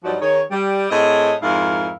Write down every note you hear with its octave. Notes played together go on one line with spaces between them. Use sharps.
G2 F3 F#3 D#4 F#4 D5
D#3 D#4 G#4 C#5
G3
A2 C4 G#4 D#5
F2 G#2 E4 A#4 F5